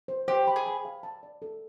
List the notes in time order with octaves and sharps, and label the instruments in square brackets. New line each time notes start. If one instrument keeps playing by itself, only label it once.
[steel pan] C5
[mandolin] G4 [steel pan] C5
[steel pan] B5
[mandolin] G#4
[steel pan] B5
F5
A5
D5
A4